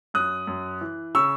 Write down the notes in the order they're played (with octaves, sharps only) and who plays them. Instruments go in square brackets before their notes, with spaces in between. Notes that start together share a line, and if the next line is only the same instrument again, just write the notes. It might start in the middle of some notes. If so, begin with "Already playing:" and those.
[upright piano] F#2 D#6 F#6
F#2
E3
C#3 C#6 E6